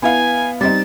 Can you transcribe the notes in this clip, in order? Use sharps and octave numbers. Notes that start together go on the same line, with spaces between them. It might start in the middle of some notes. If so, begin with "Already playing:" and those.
B3 E4 F5 G#5
G3 C4 D#4 A6